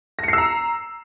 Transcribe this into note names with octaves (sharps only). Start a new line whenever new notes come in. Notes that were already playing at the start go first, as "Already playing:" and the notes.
A#5 E6 A#6 C7 C#7